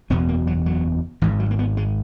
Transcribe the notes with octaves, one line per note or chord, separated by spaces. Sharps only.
F#1 E2 B2 B3
A#3
F#3
F#3
G#1 G#2 E3
F#3
A#3
B3
G#3